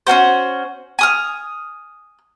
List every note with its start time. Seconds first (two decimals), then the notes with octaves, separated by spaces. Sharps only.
0.07 C#4 D4 F#4 C5
0.99 G#5 D#6 F6